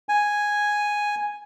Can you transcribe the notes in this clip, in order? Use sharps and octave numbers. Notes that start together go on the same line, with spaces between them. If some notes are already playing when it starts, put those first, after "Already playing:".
G#5